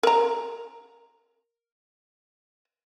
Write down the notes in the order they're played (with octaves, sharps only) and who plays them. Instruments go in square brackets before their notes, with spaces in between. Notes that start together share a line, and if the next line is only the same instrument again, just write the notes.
[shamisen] A#4 A#5